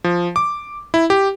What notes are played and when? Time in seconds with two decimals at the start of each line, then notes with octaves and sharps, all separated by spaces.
0.04 F3
0.36 D6
0.94 E4
1.10 G4